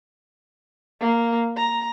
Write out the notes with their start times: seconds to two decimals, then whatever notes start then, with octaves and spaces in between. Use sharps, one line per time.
1.01 A#3
1.57 A#5